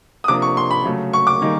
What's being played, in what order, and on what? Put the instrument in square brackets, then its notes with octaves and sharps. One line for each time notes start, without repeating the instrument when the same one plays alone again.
[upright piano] D#6
[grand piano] C3 F3 A#3 D4 [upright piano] D6
[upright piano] C#6
C6
B5
[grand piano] C#3 F#3 A3
[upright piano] C#6
D6
[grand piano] D#3 G3 A#3 D#4 G#4